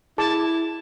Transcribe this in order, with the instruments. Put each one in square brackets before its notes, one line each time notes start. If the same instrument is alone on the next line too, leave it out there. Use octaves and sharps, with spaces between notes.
[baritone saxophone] E4 [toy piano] G#4 [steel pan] A5